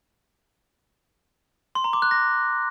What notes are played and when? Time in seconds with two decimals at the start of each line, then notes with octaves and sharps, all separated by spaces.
1.75 C6
1.84 A#5
1.93 D6
2.02 F#6
2.11 A#6